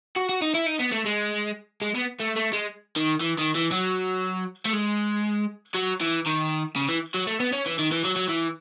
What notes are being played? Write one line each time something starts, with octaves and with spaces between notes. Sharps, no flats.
F#4
F#4
D#4
E4
D#4
B3
A3
G#3
G#3
B3
A3
A3
G#3
D#3
E3
D#3
E3
F#3
A3
G#3
F#3
E3
D#3
C#3
E3
F#3
A3
B3
C#4
E3
D#3
E3
F#3
F#3
E3